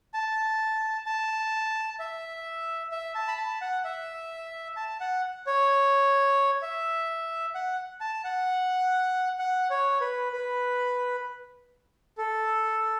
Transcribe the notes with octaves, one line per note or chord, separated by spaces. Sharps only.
A5
A5
E5
E5
A5
B5
A5
F#5
E5
A5
F#5
C#5
E5
F#5
A5
F#5
F#5
C#5
B4
B4
A4